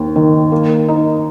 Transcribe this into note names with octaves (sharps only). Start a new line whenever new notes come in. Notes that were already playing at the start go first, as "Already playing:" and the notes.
Already playing: D#2
D#3
A#3
D#4